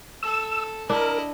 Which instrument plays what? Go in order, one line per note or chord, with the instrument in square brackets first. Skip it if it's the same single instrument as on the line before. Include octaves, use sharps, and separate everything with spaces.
[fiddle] A4 [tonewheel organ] E6
[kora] D4 [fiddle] E4 D#5 [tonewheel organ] A#4